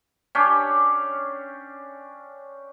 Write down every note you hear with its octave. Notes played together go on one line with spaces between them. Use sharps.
C#4 D4 G4